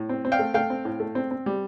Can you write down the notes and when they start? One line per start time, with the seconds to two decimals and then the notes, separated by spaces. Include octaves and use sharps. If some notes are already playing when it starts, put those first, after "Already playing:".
Already playing: A2
0.09 C4
0.25 C4
0.32 F5 G5
0.39 A3
0.54 A3 F5 G5
0.70 C4
0.85 A2
1.00 A3
1.15 C4
1.31 C4
1.46 G3